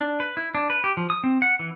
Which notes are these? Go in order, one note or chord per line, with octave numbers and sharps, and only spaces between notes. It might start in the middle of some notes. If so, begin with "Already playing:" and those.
D4
B4
E4
D4
B4
G4
F3
D#6
C4
F#5
E3